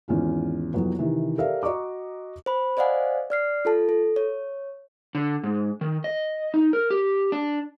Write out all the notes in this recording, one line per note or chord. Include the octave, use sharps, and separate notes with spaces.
G#1 E2 C#4 F4
C2 F2 F#3 B3
C3 D#3 E3
G4 A4 A#4 D5 E5 F5
F#4 D#5 A#5 C#6 D6
C5 B5
C5 D5 D#5 F5 F#5 G#5
D5 F6 C7
F4 A4 A5
A4
C#5
D3
G#2
D#3
D#5
D#4
A#4
G4
D4